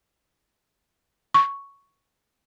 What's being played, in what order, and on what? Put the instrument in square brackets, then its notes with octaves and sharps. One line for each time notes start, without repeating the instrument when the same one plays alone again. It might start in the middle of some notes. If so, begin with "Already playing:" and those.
[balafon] C#6